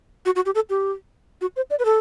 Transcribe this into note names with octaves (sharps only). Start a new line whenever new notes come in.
F#4
F#4
G4
A4
G4
F#4
C5
D5
B4
A4